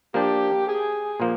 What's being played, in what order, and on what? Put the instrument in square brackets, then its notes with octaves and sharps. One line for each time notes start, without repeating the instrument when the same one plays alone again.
[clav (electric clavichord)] F3 A#3 D4 [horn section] G4
[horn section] G#4
[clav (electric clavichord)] A#2 F3 A#3